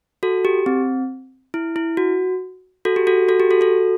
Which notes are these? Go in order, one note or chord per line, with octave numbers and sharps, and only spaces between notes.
F#4 A4
G4
C4
E4
E4
F#4
F#4 A4
G4
F#4 A4
F#4 A4
G4
F#4 A4
F#4 A4